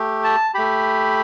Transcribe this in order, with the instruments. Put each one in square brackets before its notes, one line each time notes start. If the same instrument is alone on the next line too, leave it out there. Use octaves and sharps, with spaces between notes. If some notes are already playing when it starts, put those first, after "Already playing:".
Already playing: [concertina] A3 G4
A5
A3 G4 B5